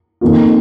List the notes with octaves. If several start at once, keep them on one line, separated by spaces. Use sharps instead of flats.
F2 D#3 A#3 F4